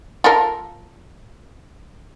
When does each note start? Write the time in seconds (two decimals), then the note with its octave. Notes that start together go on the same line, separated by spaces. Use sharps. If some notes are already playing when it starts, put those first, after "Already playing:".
0.24 F4 A4 A#4